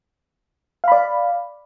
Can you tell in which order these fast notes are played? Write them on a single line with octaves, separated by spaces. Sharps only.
F5 B5 D5